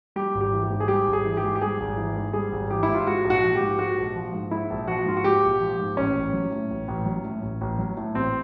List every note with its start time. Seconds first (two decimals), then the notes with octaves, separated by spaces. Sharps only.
0.16 G3 G4
0.35 G#1
0.41 G4
0.53 E3
0.64 G4
0.70 G#2
0.80 G#4
0.88 G3 G4
1.07 G#1
1.13 G#4
1.24 E3
1.37 G4
1.44 G#2
1.55 G4
1.62 G3 G#4
1.80 G#1
1.97 E3
2.16 G#2
2.33 G3 G#4
2.52 G#1
2.70 E3 G4
2.83 G#2 E4
2.94 F4
3.07 G#3 F#4
3.24 A#1
3.30 F#4
3.43 F3
3.55 G4
3.61 G#2
3.79 G#3 F#4
3.98 A#1
4.16 F3
4.33 G#2
4.51 G#3 E4
4.70 A#1
4.87 F3 F#4
5.06 G#2 F4
5.17 F#4
5.24 G#3 G4
5.43 A#1
5.61 F3
5.79 G#2
5.97 A1 C#4
6.16 A1
6.34 F#3
6.51 A2
6.70 A1
6.88 A1
7.06 F#3
7.25 A2
7.43 A1
7.61 A1
7.79 F#3
7.97 A2
8.15 A1 C4